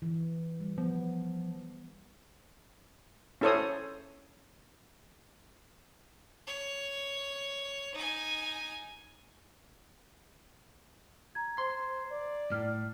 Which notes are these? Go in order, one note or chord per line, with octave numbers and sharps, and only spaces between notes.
E3
G3
F3 B3
C#4 E4 A4 C5 C#5 D#6
C#5
D#4 G#5
A#5 G#6
C5 C6
D5
A2 F6